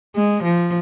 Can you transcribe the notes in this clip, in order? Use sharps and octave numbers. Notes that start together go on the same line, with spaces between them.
G#3
F3